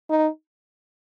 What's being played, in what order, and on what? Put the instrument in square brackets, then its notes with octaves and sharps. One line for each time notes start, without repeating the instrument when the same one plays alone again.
[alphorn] D#4